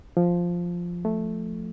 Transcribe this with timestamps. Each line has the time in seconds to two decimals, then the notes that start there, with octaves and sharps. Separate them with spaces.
0.17 F3
1.05 A3